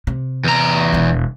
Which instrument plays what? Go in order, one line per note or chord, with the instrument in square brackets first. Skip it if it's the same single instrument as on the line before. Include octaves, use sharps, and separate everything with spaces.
[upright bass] C3
[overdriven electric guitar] E2 A#5
[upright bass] E1 D4